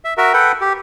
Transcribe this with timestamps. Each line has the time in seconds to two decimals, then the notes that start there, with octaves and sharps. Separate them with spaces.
0.05 E5
0.17 F#4 A#4 E5
0.33 A4 B4 F#5 G5
0.61 G4